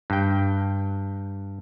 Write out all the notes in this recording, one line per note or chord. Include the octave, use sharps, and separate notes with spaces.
G2 G5